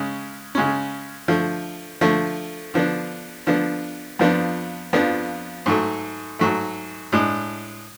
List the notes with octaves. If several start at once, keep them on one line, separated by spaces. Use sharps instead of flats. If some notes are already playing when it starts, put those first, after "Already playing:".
Already playing: C#3 G#3 C#4
C#3 G#3 C#4
D3 F3 A3
D3 F3 A3
D3 F3 B3 D4
D3 F3 B3 D4
F2 F3 B3 D4
F2 F3 B3 D4
G#2 F#3 A3
G#2 F#3 A3
A2 G#3 D4